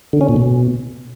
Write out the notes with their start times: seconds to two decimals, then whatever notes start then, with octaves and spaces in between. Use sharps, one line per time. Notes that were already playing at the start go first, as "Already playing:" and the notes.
0.13 D3
0.21 C#4
0.29 A#2
0.36 B2